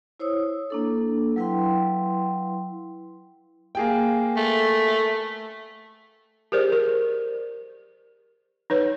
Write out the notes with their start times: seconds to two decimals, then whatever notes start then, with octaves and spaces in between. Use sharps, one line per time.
0.20 E4 C5 C#5 D#6 E6
0.70 A#3 D4 A4
1.36 F#3 E4 B4 F5 G5 C6
3.75 A#3 G#4 G5
4.37 A3
6.52 G4 G#4 A#4 C5 D5
6.72 A#4
8.70 D#4 B4 C#5